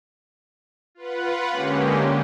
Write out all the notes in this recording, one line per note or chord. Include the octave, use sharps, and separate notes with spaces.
F4 B4 F#5
D3 G#3 A#3 C#4 G4